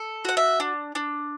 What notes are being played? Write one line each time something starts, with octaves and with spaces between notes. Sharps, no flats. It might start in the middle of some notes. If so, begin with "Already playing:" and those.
Already playing: A4
F#4 F#5
E5
D4
D4